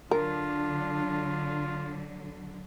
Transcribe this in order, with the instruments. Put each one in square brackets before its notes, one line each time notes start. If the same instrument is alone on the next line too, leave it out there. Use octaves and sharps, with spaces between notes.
[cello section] D3 F#3 [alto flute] D4 [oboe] F4 [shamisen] A#4